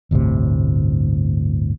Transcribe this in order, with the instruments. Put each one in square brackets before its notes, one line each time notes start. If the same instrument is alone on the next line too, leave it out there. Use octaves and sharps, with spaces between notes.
[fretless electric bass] G1 D2 A2 C3